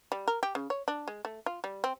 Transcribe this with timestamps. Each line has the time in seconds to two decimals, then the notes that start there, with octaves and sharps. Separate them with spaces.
0.12 G3
0.28 A#4
0.43 G4
0.55 C#3
0.70 C#5
0.88 D4
1.08 G#3
1.25 A3
1.46 F4
1.64 G3
1.84 C4